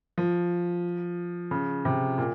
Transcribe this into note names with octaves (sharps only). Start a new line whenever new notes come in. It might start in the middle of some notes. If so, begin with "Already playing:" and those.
F3
C#3
C3
A#2